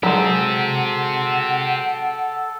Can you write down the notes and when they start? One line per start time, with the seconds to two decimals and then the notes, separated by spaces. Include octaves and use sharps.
0.03 F#3 G#3 G4 A4 C5 F#5